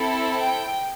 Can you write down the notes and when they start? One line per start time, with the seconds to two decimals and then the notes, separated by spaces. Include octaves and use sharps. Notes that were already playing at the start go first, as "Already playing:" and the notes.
Already playing: C4 E4 A4
0.35 G5